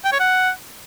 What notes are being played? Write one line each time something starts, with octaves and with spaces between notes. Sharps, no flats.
G5
C#5
F#5